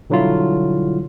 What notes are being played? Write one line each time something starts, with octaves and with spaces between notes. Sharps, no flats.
B2 D3 F#3 G3 E4 F4